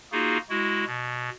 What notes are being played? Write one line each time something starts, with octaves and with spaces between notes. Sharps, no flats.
A#3 D#4 F4 F#4 G#4
G#3 E4 F#4
B2